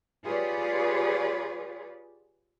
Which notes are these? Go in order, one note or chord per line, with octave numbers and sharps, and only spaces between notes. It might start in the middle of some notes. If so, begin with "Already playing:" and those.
F4 G4 G#4 B4 C#5 D5